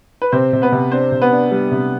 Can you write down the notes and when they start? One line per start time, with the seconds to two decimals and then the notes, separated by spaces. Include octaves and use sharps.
0.22 B4
0.32 C3 C4 C5
0.53 C3
0.62 B3 B4
0.72 C3
0.91 C4 D4 C5
1.12 C3
1.22 B3 B4
1.32 D4
1.51 G3
1.71 C3